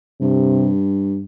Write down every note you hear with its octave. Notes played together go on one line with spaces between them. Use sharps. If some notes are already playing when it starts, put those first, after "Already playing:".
G2 C3